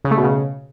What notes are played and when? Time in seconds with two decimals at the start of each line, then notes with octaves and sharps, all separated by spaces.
0.05 C#3
0.11 A3
0.17 B2
0.24 C#3